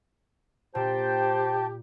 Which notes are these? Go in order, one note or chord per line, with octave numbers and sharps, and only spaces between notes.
A#2 G4 C5 G5 A5